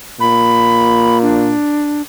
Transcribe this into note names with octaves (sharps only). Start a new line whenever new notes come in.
A#2 B5
D4